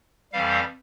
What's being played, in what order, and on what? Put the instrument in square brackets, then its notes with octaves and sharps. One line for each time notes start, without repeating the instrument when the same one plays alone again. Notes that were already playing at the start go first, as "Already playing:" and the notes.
[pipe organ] F2 E3 G3 F5